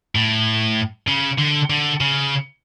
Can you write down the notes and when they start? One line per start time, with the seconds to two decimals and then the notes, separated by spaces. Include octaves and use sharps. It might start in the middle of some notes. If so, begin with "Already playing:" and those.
0.15 A2
1.08 C#3
1.39 D3
1.70 D3
2.01 C#3